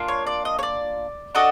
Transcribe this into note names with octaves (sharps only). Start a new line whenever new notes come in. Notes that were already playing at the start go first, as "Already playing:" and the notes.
Already playing: A#3 D4 F4
C#5
D5
D#5
C#5
D5
D4 F#4 A4 D#5